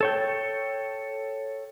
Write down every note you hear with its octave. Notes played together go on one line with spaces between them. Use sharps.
A4 C#5 G5